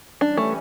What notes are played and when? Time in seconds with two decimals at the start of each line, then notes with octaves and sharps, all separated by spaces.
0.21 E3 G3 C#4 D4
0.37 A3